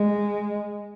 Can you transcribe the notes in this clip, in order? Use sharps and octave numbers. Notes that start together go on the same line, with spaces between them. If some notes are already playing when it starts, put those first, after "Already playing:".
Already playing: G#3